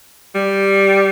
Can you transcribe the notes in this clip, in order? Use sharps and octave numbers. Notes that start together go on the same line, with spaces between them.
G3